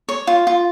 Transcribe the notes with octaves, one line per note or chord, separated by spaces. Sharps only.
C#5
F4
F4